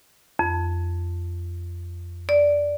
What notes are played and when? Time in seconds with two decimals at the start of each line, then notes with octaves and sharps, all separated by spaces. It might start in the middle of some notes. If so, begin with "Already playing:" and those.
0.39 F2
2.29 D5